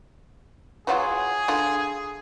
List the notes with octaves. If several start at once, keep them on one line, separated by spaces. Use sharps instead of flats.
E3 F#3 F4 G#4
D3 F4